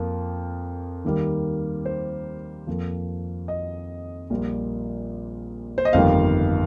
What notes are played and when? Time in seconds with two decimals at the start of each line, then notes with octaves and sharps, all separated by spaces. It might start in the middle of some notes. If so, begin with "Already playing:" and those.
Already playing: F2 F3 A#3
1.04 D#2 D#3 G3 A#3
1.85 C5
2.67 F2 F3 A#3
3.48 D#5
4.30 A#1 A#2 G3 A#3
5.78 C5
5.85 D#5
5.93 G1 F2 D#3 G3 A#3 F5